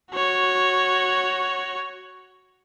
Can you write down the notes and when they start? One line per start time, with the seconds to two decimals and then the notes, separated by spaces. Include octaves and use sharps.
0.11 F#4 C#5